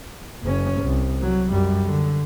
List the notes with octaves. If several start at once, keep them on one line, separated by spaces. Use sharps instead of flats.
F#1 C#4
C2
F#3
F#2 G3
D3